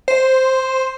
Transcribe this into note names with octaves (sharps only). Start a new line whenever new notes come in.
C5